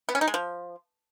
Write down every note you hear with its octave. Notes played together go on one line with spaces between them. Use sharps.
B3
C#4
D#4
G#3
F3